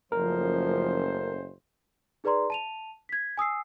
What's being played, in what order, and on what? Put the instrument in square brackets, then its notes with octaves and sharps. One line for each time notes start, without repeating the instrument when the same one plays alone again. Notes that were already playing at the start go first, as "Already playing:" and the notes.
[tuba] F#1 [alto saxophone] F3 [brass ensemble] A3 C#4 C5 [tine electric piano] A#4
[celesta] D#4 G#4 B4 D5 A#5 C6
A5 D#7 F7
G#6 B6
G#5 D#6 E6 C7